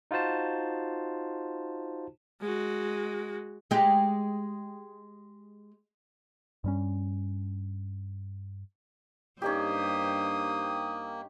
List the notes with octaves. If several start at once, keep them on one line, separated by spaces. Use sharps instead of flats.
D#4 F4 F#4 C5 A5
G#3 F#4
G#3 G4
G2 G3 C#4
G2 A#3 C#4 D#4 G4 C5 D#6